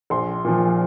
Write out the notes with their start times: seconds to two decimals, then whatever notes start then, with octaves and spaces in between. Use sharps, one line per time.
0.10 A#1 C6
0.44 A#2 F3